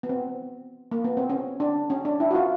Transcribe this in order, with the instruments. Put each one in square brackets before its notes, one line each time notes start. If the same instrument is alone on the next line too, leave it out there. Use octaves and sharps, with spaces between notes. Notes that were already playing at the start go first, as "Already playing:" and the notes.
[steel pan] B3
C4
A#3
B3
C4
C#4
D4
C#4
D4
E4
F#4
F4